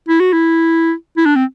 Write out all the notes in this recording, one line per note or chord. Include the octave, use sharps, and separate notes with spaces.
E4
F#4
E4
E4
D4
C4